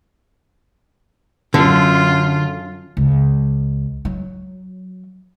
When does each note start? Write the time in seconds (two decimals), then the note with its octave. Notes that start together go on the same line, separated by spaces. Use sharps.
1.54 F#2 D3 F4
2.97 C#2
4.05 F#3